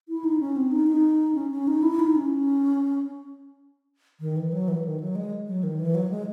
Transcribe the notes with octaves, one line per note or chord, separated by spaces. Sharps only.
E4
D#4
C#4
C4
D#4
D#4
C#4
C#4
D#4
E4
D#4
C#4
D#3
E3
F#3
E3
D#3
F#3
G#3
F#3
D#3
E3
F#3
G#3